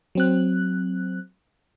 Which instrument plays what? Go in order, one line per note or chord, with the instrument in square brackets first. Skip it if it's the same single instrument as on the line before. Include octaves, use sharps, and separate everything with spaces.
[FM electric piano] F#3 C4 F#6